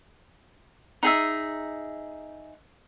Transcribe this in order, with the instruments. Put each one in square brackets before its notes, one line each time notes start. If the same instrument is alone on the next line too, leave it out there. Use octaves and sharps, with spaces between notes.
[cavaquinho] D#4 G#4 E5